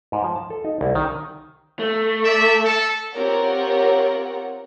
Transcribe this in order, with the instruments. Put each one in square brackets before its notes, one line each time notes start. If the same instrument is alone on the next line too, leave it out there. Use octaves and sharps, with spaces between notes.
[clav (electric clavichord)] G#2
F3
A5
A4
D#4
C2
D#3
[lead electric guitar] A3
[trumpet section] D5 E5
A4
[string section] C4 F4 G4 A#4 C#5 F#5